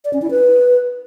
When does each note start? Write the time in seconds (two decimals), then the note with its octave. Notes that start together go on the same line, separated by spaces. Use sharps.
0.05 D5
0.13 C#4
0.22 E4
0.31 B4